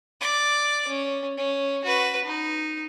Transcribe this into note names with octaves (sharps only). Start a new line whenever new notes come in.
D5 D6
C#4
C#4
F#4 B4
D#4